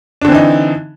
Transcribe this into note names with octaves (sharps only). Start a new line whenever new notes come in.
D3 E3 C4 D4 D#4